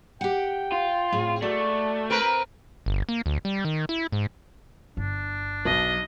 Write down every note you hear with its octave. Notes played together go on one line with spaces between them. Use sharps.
G4 F#5 G5
F4
A2 C4 G#4
A3 F#4 D5
C4 A#4 B4
G1
A#3
D2
G3
D#3
E4
G#2
G1 D4
B1 D#5